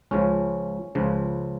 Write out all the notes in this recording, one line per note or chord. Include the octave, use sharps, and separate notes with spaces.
C#2 C#3 F3 C#4
C#2 C#3 F3